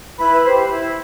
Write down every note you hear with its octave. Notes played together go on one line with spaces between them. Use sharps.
E4 B4 B5
G4 C5
E4